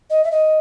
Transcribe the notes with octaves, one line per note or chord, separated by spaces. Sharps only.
D#5
E5
D#5